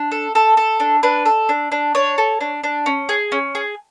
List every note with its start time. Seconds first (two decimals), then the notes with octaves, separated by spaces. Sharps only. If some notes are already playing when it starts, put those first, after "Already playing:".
Already playing: D4
0.12 A4
0.35 A4
0.57 A4
0.80 D4
1.03 D4 B4
1.26 A4
1.49 D4
1.72 D4
1.95 D4 C#5
2.18 A4
2.41 D4
2.64 D4
2.86 C#4
3.09 G#4
3.32 C#4
3.55 G#4